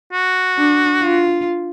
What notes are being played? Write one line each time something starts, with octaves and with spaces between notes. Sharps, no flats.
F#4
D4
F4